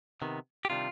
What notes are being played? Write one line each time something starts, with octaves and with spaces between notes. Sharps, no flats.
C3 D#3 B3
G4
C3 D#3 G3 D4 F4